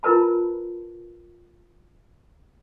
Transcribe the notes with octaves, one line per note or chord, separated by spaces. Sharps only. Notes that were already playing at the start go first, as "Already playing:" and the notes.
E4 F4 A#4 B4 A5 B5